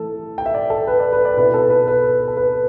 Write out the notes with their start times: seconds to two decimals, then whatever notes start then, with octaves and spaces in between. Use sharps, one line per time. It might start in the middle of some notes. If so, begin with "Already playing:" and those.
Already playing: E3 A3 A4
0.38 G5
0.46 E5
0.54 D5
0.70 A4
0.87 B4
1.00 D5
1.12 B4
1.25 D5
1.37 B2 B3 E4 B4
1.54 A4
1.70 B4
1.88 B4
2.28 A4
2.37 B4